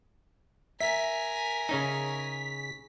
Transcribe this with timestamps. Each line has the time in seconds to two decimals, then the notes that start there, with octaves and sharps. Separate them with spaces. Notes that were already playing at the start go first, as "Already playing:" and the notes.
0.80 A#4 E5 G#5 B6
1.69 C#3 C#4 D#4